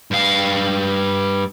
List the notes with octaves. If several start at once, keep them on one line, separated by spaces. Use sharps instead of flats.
G2 F5